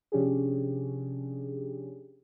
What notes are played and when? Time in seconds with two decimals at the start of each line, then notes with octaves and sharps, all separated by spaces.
0.12 C3 F3 C#4 D4 G4 G#4